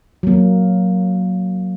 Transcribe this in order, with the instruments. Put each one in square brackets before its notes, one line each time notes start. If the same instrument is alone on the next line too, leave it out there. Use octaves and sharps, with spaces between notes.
[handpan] F#3 A#3